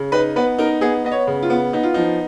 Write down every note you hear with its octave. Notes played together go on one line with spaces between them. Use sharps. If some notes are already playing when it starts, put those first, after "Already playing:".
Already playing: C#3
D#4 B4
B3 B4
D#4 A#4
B3 G#4
B3 D#5
C#5
C#3
F4
B3
B3 D#4
F4
F3 D#4